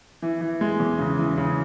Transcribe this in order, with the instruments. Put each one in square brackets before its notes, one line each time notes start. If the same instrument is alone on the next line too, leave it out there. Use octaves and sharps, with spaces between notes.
[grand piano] E3
E3
G#3
E2
C#3
E3
C#3